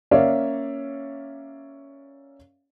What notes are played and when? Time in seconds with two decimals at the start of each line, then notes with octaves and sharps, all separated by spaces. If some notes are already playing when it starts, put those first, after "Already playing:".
0.11 A#3 C#4 C#5 D5 E5 F5